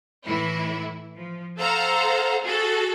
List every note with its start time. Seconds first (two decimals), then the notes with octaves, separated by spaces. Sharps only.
0.25 A2 E3 E4
1.15 F3
1.57 A4 C5 F5 F#5 A#5
2.44 F#4 G#4 A4